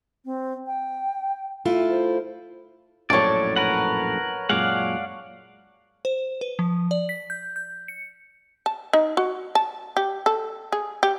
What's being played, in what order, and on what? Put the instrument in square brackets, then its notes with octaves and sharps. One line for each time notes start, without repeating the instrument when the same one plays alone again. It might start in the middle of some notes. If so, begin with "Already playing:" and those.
[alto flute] C4
G5
[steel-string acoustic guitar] A3 E4 F4
[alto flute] C5
[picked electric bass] A#1 F#2 A2 [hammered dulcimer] C#5 A5 [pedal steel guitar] D5
[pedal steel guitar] A#4 B4 F#5
[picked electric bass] F#2 A#2 G#3 [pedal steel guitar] D5 F5 F#5
[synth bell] C5
B4
F3
D5
B6
G6
G6
C#7
[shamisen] A5
D#4
F#4
A5
G4
A4
G#4
G4